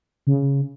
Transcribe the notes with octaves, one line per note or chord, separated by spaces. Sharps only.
C#3